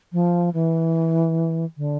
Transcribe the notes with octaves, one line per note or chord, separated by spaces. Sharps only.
F3
E3
D3